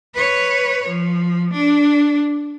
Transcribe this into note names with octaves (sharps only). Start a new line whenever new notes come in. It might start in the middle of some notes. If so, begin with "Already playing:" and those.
B4 C#5
F3
D4